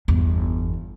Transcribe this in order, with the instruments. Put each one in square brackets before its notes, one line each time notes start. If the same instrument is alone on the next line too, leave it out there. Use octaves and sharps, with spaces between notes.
[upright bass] G1 E2